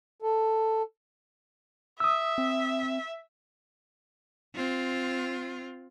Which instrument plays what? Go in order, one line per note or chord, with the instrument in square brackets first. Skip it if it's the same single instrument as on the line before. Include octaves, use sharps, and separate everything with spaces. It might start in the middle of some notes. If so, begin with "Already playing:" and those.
[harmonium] A4
[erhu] E5 [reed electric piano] D#6 E6
[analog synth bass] C4
[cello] C4 F4